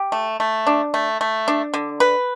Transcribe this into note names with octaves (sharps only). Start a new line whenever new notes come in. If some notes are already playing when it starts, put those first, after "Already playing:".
Already playing: G4
A3
A3
D4
A3
A3
D4
D3
B4